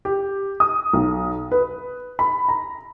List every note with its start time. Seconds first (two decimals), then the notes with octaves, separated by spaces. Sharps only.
0.05 G4
0.60 D#6
0.93 B1
1.52 B4
2.19 B5
2.49 A#5